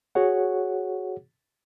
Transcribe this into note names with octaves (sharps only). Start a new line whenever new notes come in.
F#4 G#4 C#5 F#5